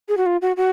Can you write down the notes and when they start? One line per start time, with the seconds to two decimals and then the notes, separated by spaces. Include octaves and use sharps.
0.08 G#4
0.17 F#4
0.26 F4
0.42 F#4
0.57 F#4